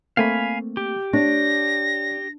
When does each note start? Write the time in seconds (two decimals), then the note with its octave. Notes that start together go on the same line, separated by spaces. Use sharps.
0.17 A3 A#3 C4 F5 G#5 B5
0.77 G4
1.13 D4 C#5 A#6